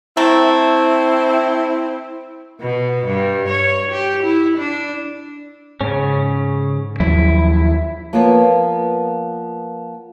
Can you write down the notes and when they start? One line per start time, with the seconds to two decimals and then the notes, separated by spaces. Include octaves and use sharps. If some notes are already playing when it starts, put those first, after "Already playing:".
0.17 A3 C4 E4 A#4
2.61 B2
3.06 G2
3.48 C#5
3.92 G4
4.23 E4
4.58 D4
5.81 G#2 C#3 C#4
7.00 D#2 F3 F#3 E4
8.13 F3 A#3 B3 F4 B4 C#5